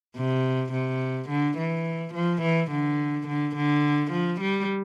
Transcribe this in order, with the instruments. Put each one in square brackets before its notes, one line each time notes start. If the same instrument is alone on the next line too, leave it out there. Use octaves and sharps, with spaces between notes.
[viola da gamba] C3
C3
D3
E3
F3
E3
D3
D3
D3
F3
G3